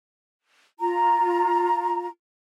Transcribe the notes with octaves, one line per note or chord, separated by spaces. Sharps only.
F4 A#5